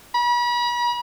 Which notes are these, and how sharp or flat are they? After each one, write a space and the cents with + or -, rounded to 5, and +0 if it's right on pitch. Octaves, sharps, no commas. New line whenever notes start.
B5 -40